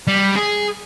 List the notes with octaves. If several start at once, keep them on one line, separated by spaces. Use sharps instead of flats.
G3
G#4